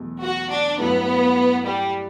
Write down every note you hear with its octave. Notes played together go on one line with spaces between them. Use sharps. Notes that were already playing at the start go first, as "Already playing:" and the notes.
Already playing: E2 B2 F#3 A3
F#4
D4
G2 F#3 A3 B3 E4
G3